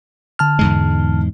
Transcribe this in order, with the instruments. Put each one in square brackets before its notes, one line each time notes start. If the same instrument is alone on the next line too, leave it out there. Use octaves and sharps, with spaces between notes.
[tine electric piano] D3 A5 F6
[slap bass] E2 G#2 G#3